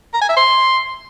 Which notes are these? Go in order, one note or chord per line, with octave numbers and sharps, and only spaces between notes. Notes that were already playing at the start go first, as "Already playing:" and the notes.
A#5
G#5
E5
C6